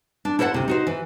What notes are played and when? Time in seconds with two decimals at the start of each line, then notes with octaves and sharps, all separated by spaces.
0.25 D4
0.39 E4 A4 C5 E5 F#5
0.54 D2 C3
0.68 D#4 F#4 C5
0.87 E3